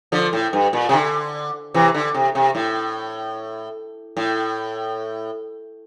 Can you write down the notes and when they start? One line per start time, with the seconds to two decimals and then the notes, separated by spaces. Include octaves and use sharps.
0.12 D3 F3
0.33 A2
0.53 G2
0.73 A#2
0.89 C3
0.93 D3
1.74 C3 E3
1.95 D3
2.14 C3
2.35 C3
2.55 A2
4.17 A2